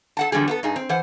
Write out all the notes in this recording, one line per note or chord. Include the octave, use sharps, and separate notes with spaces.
A4 F#5 A5
E2 D3 F#3 G3 G#4
B3 F4 A4
G2 D#4 G#4
C4
E3 C5 F#5